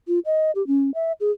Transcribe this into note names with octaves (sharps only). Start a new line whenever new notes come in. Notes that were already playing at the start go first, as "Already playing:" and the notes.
F4
D#5
G4
C#4
E5
G#4